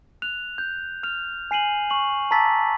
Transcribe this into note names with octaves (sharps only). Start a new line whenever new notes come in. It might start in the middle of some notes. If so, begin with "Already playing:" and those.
F#6 F7
G6
F6 F7
G#5 C7 D#7 F#7
C#6 F#7
A5 A#5 D6 E6 A6 B6